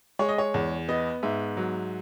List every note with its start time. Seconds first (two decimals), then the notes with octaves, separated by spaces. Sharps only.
0.19 G#3 C#5
0.29 D#5
0.38 C#5
0.54 E2
0.88 B3 D#5
1.23 G#2 E5
1.57 F#3